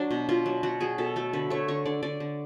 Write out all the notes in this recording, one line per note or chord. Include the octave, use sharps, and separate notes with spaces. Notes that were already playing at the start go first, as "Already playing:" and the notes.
Already playing: F#3 D4
B2
B2 F4
F#3
F#3 F#4
F#3 G#4
B2 A4
A3 A4
D3 B4
A3 C#5
D3 C#5
D3 D5
D3 D5
D3